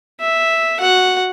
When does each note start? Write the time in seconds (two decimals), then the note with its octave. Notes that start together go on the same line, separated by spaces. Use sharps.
0.20 E5
0.80 F#4 F#5